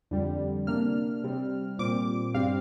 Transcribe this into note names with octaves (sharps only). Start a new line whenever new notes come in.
F2 D3 G3
C3 A#3 D4 F6
C3 G3 C4
A#2 G3 C4 D6
G2 G3 C4 F5